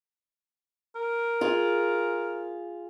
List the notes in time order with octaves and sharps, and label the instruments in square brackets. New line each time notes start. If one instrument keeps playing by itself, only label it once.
[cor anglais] A#4
[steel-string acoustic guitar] F4 G#4